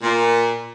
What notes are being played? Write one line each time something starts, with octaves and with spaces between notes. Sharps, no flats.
A#2